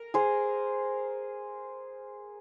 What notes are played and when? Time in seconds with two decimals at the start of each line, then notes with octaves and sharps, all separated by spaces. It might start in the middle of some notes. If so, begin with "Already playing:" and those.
Already playing: A#4
0.14 G#4 C5